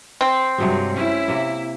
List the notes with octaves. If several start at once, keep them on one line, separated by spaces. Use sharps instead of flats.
C4
G2 C3 F#3 G#3
C#4 E4
C3 A#3